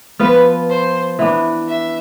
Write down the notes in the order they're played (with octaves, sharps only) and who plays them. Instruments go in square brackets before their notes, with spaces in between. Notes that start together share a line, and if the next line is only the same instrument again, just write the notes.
[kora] F3 B3 F4 [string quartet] B4
[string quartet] C5
[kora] E3 B3 D4
[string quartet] E5